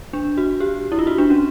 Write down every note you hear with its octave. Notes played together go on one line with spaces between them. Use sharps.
D4
F#4
G4
E4
F4
F#4
D4
C#4